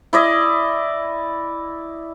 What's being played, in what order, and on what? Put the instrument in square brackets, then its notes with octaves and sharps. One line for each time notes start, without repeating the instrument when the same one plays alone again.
[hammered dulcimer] E4 D5 D#5